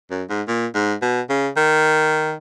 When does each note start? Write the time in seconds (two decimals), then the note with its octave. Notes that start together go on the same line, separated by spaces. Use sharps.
0.11 F#2
0.29 G#2
0.48 A#2
0.75 G#2
1.02 B2
1.29 C#3
1.57 D#3